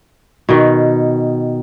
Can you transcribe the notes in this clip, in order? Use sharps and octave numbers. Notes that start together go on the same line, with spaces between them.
B2 D#3